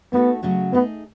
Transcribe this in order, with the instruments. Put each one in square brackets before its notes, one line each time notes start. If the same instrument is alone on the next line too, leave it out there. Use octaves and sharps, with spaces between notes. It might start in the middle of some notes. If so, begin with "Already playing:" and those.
[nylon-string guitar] A3 D#4 F#4 A4 [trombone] B3
[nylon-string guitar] C#3 F#3 A3 C#4 F#4
[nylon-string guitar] A3 D#4 G#4 [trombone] B3